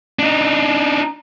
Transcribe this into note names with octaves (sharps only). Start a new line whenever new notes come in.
D4 D#4